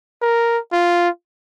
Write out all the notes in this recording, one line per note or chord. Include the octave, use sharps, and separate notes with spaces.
A#4
F4